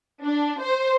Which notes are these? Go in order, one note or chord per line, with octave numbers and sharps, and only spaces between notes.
D4
C5